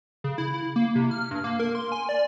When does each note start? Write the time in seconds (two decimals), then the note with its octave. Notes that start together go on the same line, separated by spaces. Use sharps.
0.24 C#3
0.38 E4
0.54 E4
0.76 A#3
0.95 C3
1.11 F6
1.31 G2
1.44 A#3
1.59 A#4
1.75 C6
1.92 G#5
2.09 D5